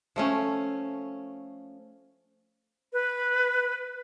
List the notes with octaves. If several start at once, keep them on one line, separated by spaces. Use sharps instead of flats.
F3 A3 C#4
B4